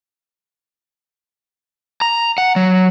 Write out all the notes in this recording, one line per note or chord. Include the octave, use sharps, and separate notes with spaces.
A#5
F#5
F#3